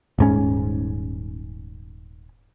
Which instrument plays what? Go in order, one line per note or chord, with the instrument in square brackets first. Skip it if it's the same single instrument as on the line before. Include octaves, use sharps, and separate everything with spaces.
[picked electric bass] D#1 G#2 C#4